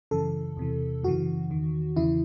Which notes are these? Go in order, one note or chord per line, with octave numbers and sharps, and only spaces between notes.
F#2 C#3 E3 A4
E2 C3 E3
F#2 C#3 E3 F#4
E2 D#3
E2 C#3 E3 E4